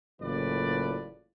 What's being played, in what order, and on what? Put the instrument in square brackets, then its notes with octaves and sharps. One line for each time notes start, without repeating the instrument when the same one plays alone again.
[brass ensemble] F#1 A2 E3 F4 B4 D5